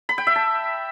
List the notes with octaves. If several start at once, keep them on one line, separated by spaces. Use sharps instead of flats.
B5
G5
E5
A5